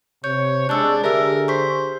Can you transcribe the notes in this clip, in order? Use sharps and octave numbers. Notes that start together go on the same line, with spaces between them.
C3 C#5 G6
G#3 D4 D5 E6 F#6
D3 G4 G#4 A#4 E5 E6
C5 C#6 B6